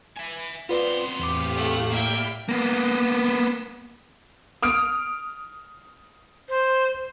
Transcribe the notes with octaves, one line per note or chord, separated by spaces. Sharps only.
E5 G#5
B3 C4 F4 B4 D5 C6
E2 A2 G4 F5 D6
A3 F#5
A#3 D5 E5 G5 B5 F6
A#3 B3
D#6 F6 D7
C5